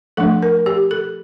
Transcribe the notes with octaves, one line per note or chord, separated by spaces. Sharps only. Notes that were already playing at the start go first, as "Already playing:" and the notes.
F3 A3 D4 A4
A#4
G4
A4